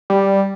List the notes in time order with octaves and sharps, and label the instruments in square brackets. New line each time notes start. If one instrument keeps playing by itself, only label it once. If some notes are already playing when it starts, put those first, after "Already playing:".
[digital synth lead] G3